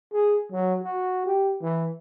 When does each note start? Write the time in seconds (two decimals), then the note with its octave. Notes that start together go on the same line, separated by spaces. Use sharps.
0.13 G#4
0.52 F#3
0.83 F#4
1.26 G4
1.62 E3